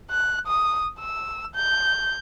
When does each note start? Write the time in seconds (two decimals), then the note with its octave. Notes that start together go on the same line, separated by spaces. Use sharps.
0.11 F#6
0.47 D#6
1.00 E6
1.55 G6